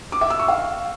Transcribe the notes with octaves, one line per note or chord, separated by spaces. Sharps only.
D6
E5
E6
C#6
F5